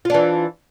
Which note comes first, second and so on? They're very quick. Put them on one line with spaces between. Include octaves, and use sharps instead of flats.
F4 D4 E3